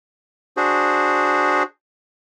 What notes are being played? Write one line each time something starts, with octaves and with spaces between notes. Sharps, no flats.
D4 F#4 G#4 C5